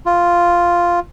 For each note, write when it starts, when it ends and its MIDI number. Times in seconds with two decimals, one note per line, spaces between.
0.06 1.00 65